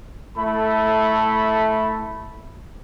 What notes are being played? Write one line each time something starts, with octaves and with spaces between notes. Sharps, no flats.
A3 E4 A4 B5